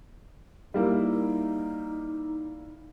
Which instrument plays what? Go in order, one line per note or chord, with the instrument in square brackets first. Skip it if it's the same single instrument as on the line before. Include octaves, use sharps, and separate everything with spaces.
[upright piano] G3 A#3 E4 [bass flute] D#4